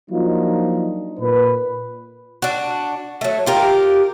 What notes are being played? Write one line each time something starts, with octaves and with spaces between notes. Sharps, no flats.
F3 F#3 A#3 D4 D#4 F4
A#2 B4
D4 F#4
F#3 A3
F4 G4 A#4